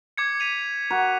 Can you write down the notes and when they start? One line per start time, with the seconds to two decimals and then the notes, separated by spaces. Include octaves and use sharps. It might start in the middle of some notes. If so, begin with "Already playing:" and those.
0.17 D6 G#6 C#7
0.40 B6 D#7 F7
0.90 F#4 A#4